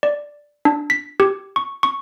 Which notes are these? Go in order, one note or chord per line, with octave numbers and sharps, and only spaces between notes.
D5
D4
B6
G4
C#6
C#6